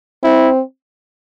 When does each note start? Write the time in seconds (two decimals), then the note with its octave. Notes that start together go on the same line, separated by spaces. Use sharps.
0.23 C4 E4